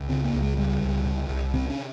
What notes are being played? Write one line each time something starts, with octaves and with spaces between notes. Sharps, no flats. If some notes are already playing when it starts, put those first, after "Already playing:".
Already playing: C#2
C#3 C4
A#3
C#2
G#3
C#3 G3
C#2
C3
C2
C3 C4
C#4